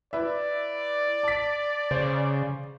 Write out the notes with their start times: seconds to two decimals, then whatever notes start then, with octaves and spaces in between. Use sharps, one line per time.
0.13 E4 B4 D5 E5
1.23 A5 B6
1.91 C#3 C5